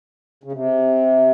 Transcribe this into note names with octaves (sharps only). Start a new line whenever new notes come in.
C#3
C3